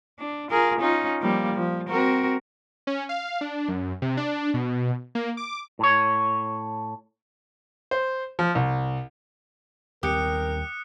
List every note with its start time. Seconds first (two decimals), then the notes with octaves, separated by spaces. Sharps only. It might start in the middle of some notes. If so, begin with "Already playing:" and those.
0.19 D4
0.51 F4 G#4 A#4
0.80 C#4 D#4 F4
1.21 F3 G3 A#3
1.54 F3
1.88 C4 F#4 A#4
2.87 C#4
3.09 F5
3.41 D4
3.68 F#2
4.02 C3
4.17 D4
4.54 B2
5.15 A#3
5.37 D6
5.79 A2 C#5
7.91 C5
8.39 F3
8.55 C2
10.03 D#2 G3 C4 G4 A#4 D#6 F#6 C#7